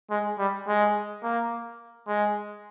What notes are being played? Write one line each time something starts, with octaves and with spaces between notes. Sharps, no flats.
G#3
G3
G#3
A#3
G#3